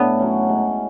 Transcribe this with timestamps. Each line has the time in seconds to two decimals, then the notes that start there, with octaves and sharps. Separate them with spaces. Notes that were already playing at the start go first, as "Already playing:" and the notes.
Already playing: A2 B3 D4
0.19 F#3 C#4
0.49 G#3